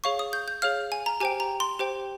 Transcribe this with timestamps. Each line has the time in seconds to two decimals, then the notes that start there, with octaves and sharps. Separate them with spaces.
0.04 G#4 C#5 F5 C#6
0.19 D#6
0.33 G6
0.48 G6
0.62 G#4 C#5 F5 F6
0.92 G#5
1.06 A#5
1.20 G4 C5 G5 G#5
1.40 A#5
1.60 C6
1.79 G4 C5 G5